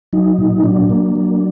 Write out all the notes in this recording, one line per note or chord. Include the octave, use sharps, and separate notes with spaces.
F#3 D#4
A#2
F#3 D4
A#3
F#3